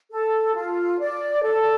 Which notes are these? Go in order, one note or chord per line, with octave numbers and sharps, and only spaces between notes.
A4
F4
D5
A4